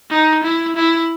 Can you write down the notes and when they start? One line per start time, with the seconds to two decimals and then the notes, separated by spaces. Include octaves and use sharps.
0.10 D#4
0.43 E4
0.76 E4